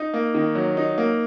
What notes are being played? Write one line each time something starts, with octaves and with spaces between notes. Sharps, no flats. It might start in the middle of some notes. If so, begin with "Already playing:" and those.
Already playing: D#4
A#3
D#3
F#3
D#4
A#3